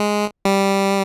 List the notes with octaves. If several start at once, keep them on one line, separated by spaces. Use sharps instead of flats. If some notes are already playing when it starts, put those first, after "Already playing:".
Already playing: G#3
G3